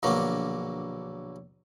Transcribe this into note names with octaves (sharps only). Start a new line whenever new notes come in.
A#1 B2 D3 F#3 A#3